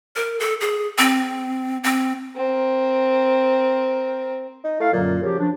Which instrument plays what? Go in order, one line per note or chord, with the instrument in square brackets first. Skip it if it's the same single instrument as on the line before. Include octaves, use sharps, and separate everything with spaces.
[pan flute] A#4
A4
G#4
C4
C4
[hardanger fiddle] C4 A#4
[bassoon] D#4
[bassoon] A3 [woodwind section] E4 F5
[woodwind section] F#2 D3 F#3 [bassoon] A#2
[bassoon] C#3 [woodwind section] F3 F#4 G4
[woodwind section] F3 C#4 D4